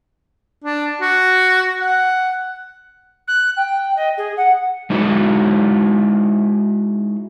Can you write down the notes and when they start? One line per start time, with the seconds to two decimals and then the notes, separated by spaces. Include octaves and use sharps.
0.64 D4
1.01 F#4
1.81 F#5
3.28 F#6
3.57 G5
3.96 D#5
4.17 G#4
4.37 F#5
4.90 G#3 D#4 E4 F#4